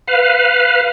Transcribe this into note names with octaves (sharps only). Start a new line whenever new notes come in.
B4 F5